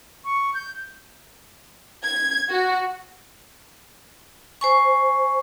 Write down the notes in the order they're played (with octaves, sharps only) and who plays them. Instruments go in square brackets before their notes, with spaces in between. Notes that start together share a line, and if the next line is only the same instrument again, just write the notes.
[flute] C#6
G6
[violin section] G#6
F#4
[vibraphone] C5 G#5 C#6